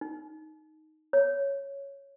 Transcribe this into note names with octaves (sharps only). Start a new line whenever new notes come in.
D#4
C#5